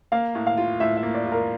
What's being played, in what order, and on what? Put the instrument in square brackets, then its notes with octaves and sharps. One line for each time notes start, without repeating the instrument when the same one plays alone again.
[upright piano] A#3 [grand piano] F5
[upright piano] A2
[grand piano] F5
[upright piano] F4
[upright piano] A2 [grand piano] E5
[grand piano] E5
[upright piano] A#3
[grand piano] D5
[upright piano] F4
[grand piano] A#4